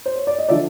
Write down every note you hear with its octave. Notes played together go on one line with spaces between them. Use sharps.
C5
C#5
D5
D#5
D3 F3 D5 E5